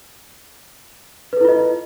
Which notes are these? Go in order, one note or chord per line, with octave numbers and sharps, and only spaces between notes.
E4 F4 A4 B4 D#5